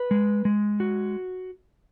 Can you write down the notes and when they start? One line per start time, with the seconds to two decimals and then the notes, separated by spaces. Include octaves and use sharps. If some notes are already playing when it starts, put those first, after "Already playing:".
Already playing: B4
0.11 G#3
0.45 G#3
0.80 F#4